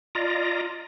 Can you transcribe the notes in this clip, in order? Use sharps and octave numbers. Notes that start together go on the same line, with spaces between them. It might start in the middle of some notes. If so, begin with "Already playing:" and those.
F4 D5 D#5 A#5